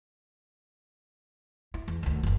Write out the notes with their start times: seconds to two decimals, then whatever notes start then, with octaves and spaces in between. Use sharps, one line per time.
1.74 E4
1.88 E2
2.03 D2 D#3
2.23 F#1 D#2